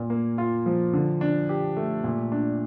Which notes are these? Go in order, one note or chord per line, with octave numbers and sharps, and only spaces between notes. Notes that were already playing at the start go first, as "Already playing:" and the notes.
Already playing: A#2
A#3
F4
F3
D3
D4
G4
A3
A#2
D4